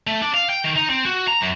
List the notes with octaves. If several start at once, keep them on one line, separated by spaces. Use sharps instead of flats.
A3
D4
F5
G5
D#3
D#4
C4
F#4
A#5
F#2